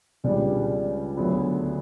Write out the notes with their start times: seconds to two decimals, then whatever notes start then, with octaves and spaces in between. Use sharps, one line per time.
0.24 C#2 C#3 G3 D4
1.17 D2 D3 F#3 B3